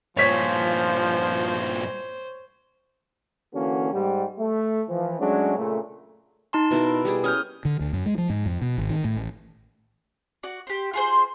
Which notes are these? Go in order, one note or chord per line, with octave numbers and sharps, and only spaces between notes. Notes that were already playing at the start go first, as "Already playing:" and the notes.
G2 A#2 F3 C5 C#5 B6
D3 E3 A#3 C#4 F#4
G#2 G3
A3
E3 F3
F#3 G#3 A3 C#4 D4
A#2 C#3 A3
D#4 A5 C6
B2 E4 A#4
G3 G4 G#4
C#4 G#5 D#6 F6 G6
D3
D2
F#2
G#3
F3
G#2
F2
B2
G#1
D#3
A2
A1
F#4 D5
G4 C5
F4 G#4 C5